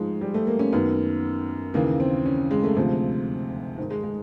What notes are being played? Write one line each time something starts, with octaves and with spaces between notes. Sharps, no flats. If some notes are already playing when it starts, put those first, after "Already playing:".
Already playing: G#2 F3 G#3
G3
A3
A#3
C#4
F#2 D#3 B3
D#2 C#3 E3 A#3
C4
C#4
G#3
A3
D2 C3 F3 G#3
G#2 D#3
G#3
G#3